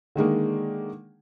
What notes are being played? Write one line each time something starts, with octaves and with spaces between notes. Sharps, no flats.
D3 D#3 G#3 A#3